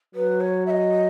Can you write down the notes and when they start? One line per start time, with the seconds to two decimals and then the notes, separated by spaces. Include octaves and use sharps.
0.15 F#3 B4
0.41 C#5
0.66 E5
0.70 D#5